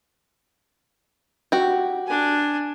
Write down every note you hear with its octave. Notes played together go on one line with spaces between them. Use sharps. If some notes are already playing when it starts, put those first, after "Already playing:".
F#4 G4
D4 G#5